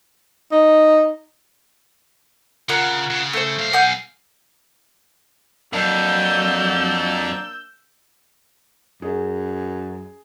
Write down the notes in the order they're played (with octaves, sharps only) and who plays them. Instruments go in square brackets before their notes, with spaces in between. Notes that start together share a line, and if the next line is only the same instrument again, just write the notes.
[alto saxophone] D#4
[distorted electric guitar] C#3 [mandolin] F4 A#4 F#5
[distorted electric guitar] C#3
[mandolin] A3 C5
[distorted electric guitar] B1 F5
[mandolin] F#5 G#5 G6
[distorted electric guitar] F2 [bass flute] F#3 [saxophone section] A#3 D4 [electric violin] E6 G6
[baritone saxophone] F#2 [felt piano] G#4